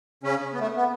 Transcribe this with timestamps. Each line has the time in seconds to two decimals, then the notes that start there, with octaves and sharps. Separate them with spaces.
0.23 C#3 C#4
0.54 B3
0.60 A3
0.76 B3